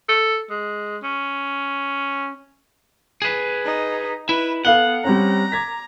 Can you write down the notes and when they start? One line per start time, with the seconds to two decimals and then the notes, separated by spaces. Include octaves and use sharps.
0.09 A4
0.50 G#3
1.03 C#4
3.22 G#4 B4
3.65 D#4
4.29 E4 B4
4.65 B3 A4 F5 F#5 G7
5.04 G3 C4 C#4 A#5
5.52 D6 G#6 B6